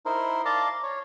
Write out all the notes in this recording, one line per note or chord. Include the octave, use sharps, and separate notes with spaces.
D#4 E4 A#4 C5
D5 F5 A5 A#5 C6 D6
C#5